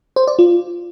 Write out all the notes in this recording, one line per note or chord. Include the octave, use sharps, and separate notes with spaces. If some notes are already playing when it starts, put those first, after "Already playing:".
C5
D5
F4